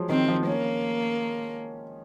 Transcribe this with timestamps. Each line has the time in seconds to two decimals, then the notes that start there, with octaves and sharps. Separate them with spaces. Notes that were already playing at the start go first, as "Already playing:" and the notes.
Already playing: F3 F#3 G#3
0.09 D#3 C4
0.28 F3
0.47 A#3 C#4